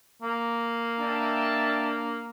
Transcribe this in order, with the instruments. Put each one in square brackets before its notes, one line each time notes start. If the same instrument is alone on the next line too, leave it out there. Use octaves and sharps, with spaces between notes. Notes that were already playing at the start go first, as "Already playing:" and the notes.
[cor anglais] A#3
[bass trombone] D4 [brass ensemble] E5 G5 A5